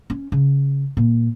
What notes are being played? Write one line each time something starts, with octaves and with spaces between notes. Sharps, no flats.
C#4
C#3
A#2